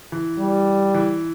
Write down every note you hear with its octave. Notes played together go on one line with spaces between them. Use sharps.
E3
G3
E3